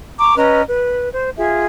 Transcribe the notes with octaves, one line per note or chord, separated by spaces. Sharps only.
A#5 C#6 D6
C#4 B4 D#5 A#5
B4
C5
F4 G#4 E5